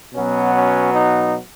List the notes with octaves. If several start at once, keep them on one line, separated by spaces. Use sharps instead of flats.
B2 F#3 B3 C#4
C#4
D#4